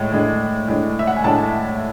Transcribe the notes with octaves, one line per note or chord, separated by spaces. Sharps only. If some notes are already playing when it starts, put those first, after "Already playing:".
Already playing: A2 G#3
A2 G#3 D4
A2 G#3 D4
E5
F#5
G#5
A2 G#3 D4 A5